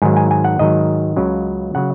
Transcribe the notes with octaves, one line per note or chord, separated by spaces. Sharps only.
G#2 D#3 F#3 G#5
G#5
G#5
F#5
G#2 D#3 F#3 D#5
C#2 C#3 F#3
C#3 F#3 F#5